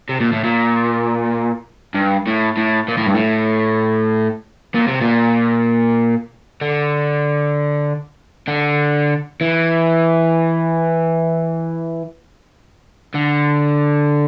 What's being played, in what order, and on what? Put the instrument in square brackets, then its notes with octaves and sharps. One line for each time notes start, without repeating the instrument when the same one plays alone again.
[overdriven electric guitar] C3
A#2
A2
A#2
G2
A2
A2
A#2
A2
G2
A2
A#2
C3
A#2
D3
D3
E3
D3